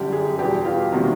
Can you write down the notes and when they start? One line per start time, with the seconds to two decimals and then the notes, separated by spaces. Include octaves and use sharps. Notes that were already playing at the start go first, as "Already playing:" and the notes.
Already playing: G1 F#2 D3 G4
0.12 G#4
0.39 E2 B2 G3 B3 G4
0.65 F4
0.92 C3 D#3 G3 A#3 F#4